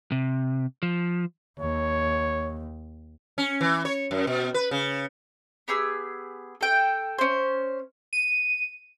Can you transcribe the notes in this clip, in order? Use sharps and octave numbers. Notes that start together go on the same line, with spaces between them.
C3
F3
D#2 C#5
C#4
E3
C#5
F#2
B2
B4
C#3
B3 G4 G#4 E6
A4 G5
C#4 C5
D#7